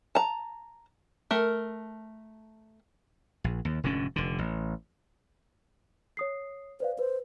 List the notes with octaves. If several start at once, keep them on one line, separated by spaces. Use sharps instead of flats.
A5 A#5
A3 A#4
A#1
D#2
F1 G#2 D3 C#4
F1 D3
A1
C#5 D#6 C7
B4 C5 D5 F5
B4 C5